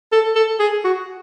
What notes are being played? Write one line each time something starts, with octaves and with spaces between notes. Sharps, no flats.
A4
A4
G#4
F#4